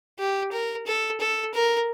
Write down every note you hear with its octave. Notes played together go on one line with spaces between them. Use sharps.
G4
A#4
A4
A4
A#4